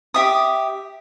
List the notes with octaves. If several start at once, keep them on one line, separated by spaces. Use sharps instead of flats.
G4 E5 D#6